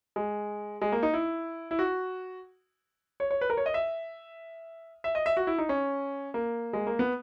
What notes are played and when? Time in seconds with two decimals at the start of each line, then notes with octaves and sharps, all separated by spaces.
0.16 G#3
0.81 G#3
0.92 A#3
1.03 D#4
1.14 E4
1.71 E4
1.79 F#4
3.20 C#5
3.31 C#5
3.41 B4
3.50 A#4
3.57 C#5
3.66 D#5
3.74 E5
5.04 E5
5.15 D#5
5.26 E5
5.37 F#4
5.47 E4
5.58 D#4
5.69 C#4
6.34 A#3
6.73 G#3
6.87 A#3
6.99 B3